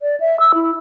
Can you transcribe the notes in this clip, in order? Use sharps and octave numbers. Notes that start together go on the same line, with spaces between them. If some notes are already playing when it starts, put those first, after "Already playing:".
D5
E5
E6
E4